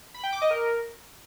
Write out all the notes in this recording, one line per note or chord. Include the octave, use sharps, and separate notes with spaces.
B5
G5
D6
D#5
A#4